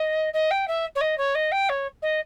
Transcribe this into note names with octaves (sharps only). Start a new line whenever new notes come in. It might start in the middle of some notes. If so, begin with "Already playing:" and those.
Already playing: D#5
D#5
G5
E5
C#5
D#5
C#5
D#5
G5
C#5
D#5